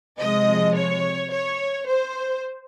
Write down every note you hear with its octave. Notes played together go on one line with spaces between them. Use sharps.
C3 F3 G#3 D#5
C#5
C#5
C5